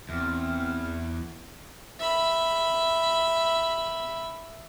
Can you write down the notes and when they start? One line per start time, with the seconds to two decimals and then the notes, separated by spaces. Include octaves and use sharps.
0.09 E2 C4 F6
1.99 E5 B5